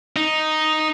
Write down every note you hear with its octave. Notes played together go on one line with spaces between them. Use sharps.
D#4